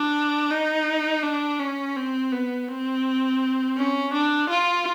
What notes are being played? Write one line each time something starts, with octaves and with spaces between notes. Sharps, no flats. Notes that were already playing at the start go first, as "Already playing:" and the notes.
Already playing: D4
D#4
D4
C#4
C4
B3
C4
C#4
D4
F4